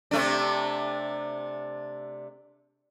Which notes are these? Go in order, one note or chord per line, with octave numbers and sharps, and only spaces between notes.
C3 A3 D4